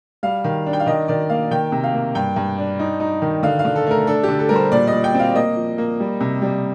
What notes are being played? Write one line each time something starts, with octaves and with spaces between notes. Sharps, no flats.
G3 F5
D#3
D4
G5
F5
D#3 D#5
D#3 D5
A#3 F5
D#3 G5
C3
F5
A#3
G2 G5
G2
D4
D#4
D#4
D#3
D3 F5
F5
D3
A4
A3 A#4
D4 A4
G4
D3
A4
G3 A#4
C5
A#2 D5
D#5
A#2
G5
C4
F5
A#3 D#5
F3
A#3
G3
C3
G3